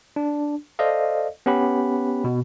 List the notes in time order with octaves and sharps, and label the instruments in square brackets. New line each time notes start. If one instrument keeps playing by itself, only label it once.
[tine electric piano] D4
A4 C5 D5 D#5 F5
B3 C#4 G4 F#5 B5
B2